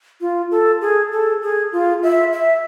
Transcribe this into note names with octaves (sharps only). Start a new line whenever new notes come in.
F4
A4
G#4
A4
G#4
F4
E5
E5